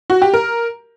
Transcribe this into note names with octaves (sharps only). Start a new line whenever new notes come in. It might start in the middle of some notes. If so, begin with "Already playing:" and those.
F#4
G4
A#4